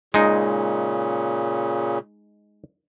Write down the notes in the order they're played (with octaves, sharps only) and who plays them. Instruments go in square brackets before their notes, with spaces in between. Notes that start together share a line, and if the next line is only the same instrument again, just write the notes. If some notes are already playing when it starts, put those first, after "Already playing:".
[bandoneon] A#2 C#3 [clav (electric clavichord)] G#3 D#4